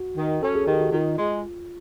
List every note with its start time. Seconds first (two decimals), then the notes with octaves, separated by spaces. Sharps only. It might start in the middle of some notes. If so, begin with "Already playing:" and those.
Already playing: F#4
0.17 D#3
0.42 C#4 A4
0.55 G#4
0.67 D#3 G4
0.81 F#4
0.92 D#3 F4
1.18 G#3